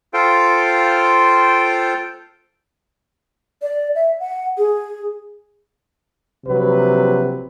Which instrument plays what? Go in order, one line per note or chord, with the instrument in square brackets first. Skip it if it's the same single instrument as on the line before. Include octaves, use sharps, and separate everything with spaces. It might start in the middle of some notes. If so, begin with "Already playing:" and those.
[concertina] F4 A4 C5 F5 G5
[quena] D5
E5
F#5
G#4
[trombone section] A#1 C3 F#3 B4